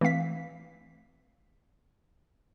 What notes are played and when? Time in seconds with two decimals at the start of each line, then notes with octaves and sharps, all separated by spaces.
0.01 E3 A3 C4 F5 B6